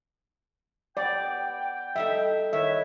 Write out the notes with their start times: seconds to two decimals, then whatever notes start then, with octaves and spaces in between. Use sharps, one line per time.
0.97 B3 D5 G5
1.96 G3 D#4 A4 E5
2.53 D#3 E4 B4 C#5 E5